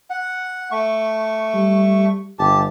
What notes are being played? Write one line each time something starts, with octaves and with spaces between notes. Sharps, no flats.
F#5
A3 C#6
G3
G1 G4 A5